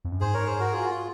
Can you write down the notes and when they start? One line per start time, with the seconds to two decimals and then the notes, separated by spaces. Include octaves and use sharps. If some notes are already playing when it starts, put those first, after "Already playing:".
0.05 F2
0.12 F#2
0.21 G#2 G#4 C5
0.34 A#4 C#5
0.46 G#4 C5
0.60 F#4 A#4
0.72 F4 G#4
0.82 F#4
0.89 F4